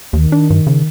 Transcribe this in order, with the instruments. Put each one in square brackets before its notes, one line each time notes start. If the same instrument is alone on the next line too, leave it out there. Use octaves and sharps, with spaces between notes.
[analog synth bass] D#2 [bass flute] D#3
[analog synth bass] D4
G2
C#3